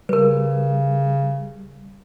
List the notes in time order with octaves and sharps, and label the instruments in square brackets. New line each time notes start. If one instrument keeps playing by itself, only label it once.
[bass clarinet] C#3 [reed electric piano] G3 [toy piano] A#4 B4